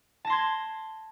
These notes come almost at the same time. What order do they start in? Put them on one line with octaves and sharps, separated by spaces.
A5 A#6 C6 G#6